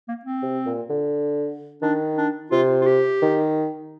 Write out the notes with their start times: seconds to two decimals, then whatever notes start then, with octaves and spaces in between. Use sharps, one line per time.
0.08 A#3
0.25 C4
0.42 C3
0.66 A#2
0.89 D3
1.82 D#3 D4
2.18 D4
2.51 C3 F4
2.81 F4
2.86 G4
3.22 D#3